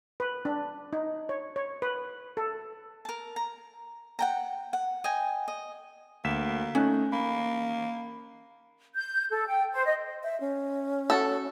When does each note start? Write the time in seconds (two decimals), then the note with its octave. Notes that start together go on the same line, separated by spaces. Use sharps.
0.20 B4
0.45 D4
0.93 D#4
1.29 C#5
1.56 C#5
1.82 B4
2.37 A4
3.05 A#4 A5
3.36 A#5
4.19 F#5 G5 A#5
4.73 F#5
5.04 D#5 G5 G#5
5.48 D#5
6.24 D2 A#3 B6 E7
6.75 A3 C#4 D#4 F#6
7.12 A#3 B5
8.95 G6
9.30 A4
9.47 G5
9.73 C5
9.85 D#5
10.23 E5
10.40 C#4
11.10 F#4 A4